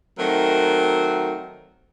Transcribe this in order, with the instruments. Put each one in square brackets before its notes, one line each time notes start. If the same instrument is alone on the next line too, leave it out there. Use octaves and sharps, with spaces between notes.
[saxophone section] D#3 F#3 A3 C4 F#4 A#4